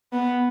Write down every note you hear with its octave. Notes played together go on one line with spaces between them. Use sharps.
B3